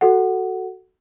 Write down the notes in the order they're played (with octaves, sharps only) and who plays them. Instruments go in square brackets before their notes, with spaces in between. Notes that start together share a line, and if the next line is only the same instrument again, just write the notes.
[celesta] F#4 A4 F#5